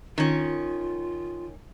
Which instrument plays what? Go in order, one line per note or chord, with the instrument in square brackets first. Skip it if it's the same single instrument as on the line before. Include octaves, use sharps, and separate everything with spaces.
[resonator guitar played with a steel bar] D#3 C#4 [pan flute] F4